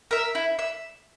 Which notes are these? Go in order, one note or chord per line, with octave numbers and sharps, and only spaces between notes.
A#4 E5
E4
E5